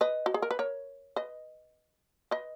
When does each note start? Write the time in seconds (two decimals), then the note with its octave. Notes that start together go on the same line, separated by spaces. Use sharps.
0.01 B4 D#5
0.26 F#4
0.34 G#4
0.42 A#4
0.51 B4
0.59 A#4 C#5
1.16 B4 D#5
2.31 B4 D#5